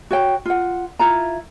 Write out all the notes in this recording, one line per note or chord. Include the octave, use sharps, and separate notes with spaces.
F#4 C#5 G5
F4 F#5
E4 F4 A#5